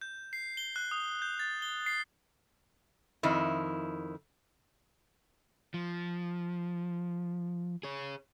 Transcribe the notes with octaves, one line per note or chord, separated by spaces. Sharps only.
G6
C7
G7
F#6
D#6
G6
A6
G7
C7
F2 D#3 E4
F3
G#4 C#5